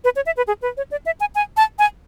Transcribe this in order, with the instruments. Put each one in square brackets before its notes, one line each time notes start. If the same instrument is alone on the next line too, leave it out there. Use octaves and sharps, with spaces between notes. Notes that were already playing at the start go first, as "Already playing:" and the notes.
[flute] B4
C#5
E5
B4
G#4
B4
C#5
D5
E5
G#5
G#5
A5
G#5